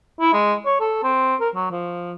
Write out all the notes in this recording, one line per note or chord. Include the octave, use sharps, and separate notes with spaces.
E4
G#3
C#5
A4
C4
A#4
F#3
F3